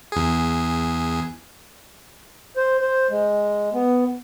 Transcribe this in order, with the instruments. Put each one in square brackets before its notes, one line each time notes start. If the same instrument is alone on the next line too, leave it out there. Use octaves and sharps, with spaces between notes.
[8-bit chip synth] E2 G#4
[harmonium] C5
C5
G#3
B3